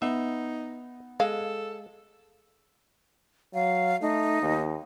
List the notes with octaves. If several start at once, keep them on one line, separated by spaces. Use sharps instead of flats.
B3 D#4 E5
G#3 A4 F5
F#3 F5
A3 D#4
D#2